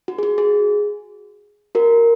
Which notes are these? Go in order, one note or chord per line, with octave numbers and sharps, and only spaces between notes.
F#4
G#4
F#4
G#4
F#4 A#4